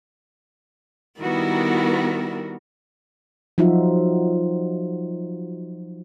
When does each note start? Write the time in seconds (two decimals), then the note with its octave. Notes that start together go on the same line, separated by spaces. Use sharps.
1.20 D#3 G3 B3 E4 F#4 A#4
3.58 F3 F#3 D#4 F4 F#4 E5